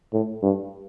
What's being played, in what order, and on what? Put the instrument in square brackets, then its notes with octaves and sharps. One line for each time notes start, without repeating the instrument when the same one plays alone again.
[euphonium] A2
G2